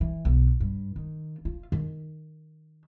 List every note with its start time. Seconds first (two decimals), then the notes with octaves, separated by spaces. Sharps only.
0.01 E3
0.25 B1
0.60 G2
0.96 D#3
1.45 F4
1.72 D#3